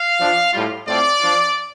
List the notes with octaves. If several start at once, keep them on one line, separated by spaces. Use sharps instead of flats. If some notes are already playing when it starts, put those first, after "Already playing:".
Already playing: F5
F3 D4 F4
A2 G3 F4
A2 A3 C4 F4 D5
F3 D4 F4